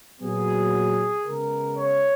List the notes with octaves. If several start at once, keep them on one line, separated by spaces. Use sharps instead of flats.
A#2 F#3 B3 G#4
C#3 G#3 B3 A#4
C#5